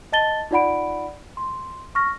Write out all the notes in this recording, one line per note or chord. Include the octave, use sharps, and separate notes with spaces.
D#5 A5 A6 G7
D#4 F4 D5 F#5 B5 D7
C6
C#6 F6 A#6